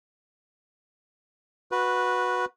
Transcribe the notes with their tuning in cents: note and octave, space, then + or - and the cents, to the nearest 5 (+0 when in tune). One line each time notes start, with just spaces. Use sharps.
F#4 -15 B4 -5